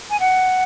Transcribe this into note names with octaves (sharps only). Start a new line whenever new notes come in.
G#5
F#5